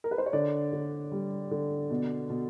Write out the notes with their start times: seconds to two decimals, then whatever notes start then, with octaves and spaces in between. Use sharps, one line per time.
0.04 A#4
0.11 B4
0.18 C5
0.26 C#5
0.33 D3 D5
0.73 D3
1.12 G3
1.51 D3
1.90 B2
2.30 B2